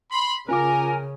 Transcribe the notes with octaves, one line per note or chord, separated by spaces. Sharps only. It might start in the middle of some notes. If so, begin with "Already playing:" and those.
B5 C6
C#3 C#4 F4 A#4 G#5 D6